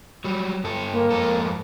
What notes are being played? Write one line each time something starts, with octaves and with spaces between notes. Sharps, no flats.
F#3 G3
G2 A4
A#3
F2 G#2 A4